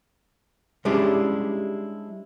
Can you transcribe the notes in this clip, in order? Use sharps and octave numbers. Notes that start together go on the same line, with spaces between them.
G3 G#3 C#4 D4 E4 G4